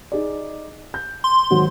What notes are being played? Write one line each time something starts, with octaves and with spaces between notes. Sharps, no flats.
D#4 G#4 D5
G6
C6
G#2 D#3 F#3